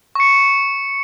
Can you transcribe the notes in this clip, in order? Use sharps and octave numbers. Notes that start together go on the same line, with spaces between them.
C#6 C#7